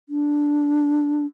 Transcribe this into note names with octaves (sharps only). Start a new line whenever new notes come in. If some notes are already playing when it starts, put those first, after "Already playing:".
D4